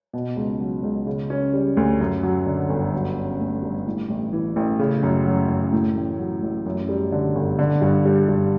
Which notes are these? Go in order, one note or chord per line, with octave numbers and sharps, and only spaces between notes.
B2
C#2
F#3
C#2
C#3
C#4
G3
D2
F#2
F#3
D3
G1
F#3
C#4
A3
G2
A2
A1
E3
A1
C#3
F#2
F#3
F#2
A2
A1
F#3
A1
F#2
G3
D3
G1
D3
G2
G3
G2